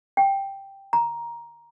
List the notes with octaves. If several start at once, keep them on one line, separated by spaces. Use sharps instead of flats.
G5
A#5